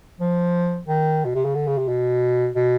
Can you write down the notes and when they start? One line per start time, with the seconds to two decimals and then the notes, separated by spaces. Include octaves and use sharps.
0.20 F3
0.88 D#3
1.25 B2
1.35 C3
1.45 C#3
1.55 D3
1.67 C#3
1.78 C3
1.88 B2
2.55 B2